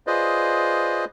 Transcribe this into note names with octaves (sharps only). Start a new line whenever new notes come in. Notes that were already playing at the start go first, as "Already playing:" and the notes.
F4 G#4 B4 C5 D5 D#5